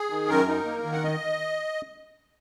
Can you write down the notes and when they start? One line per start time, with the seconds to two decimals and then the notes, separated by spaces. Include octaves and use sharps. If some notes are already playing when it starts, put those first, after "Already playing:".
Already playing: G#4
0.10 D#3
0.29 F#2 A#4
0.48 D#4
0.65 A#3
0.85 D#3
0.93 F#5
1.03 D#5